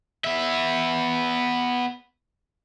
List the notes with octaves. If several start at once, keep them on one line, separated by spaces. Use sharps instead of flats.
B3 E5